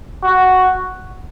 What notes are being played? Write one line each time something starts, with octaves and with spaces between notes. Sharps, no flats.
F#4